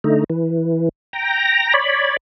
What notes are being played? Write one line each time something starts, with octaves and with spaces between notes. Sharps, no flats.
D3 A3 D#4
E3
G5 A#5 A#6
C#5 D5 B5